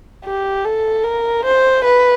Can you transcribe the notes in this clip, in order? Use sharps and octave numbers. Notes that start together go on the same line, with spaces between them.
G4
A4
A#4
C5
B4